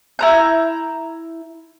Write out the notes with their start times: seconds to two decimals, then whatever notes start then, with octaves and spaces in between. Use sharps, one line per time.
0.19 E4 A#5 G6